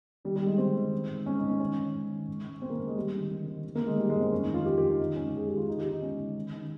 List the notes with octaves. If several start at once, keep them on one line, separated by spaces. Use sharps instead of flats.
D#3 G3
G3
D#3 G#3
D#3 C4
D#3
D#3
G#2
G#2 C#4
D#4
G#2
C#4
D#3 C#4
D#3
G#2
D#3
G#2
G#2
D#3 C4
A#3
G#2
G#3
D#3 G3
D#3
D#3
D#3
D#3
A#3
D#3
G#3
D#3 G3
G#3
G2 C4
F2 C#4
D#4
D#3
F4
D#3 G4
D#3 G4
D#4
D#3 D#4
G#2 C#4
G#2 G#4
D#3 G4
F4
D#3 D#4
G4
D#3
D#4
G#2 C#4
G#2
D#3
D#3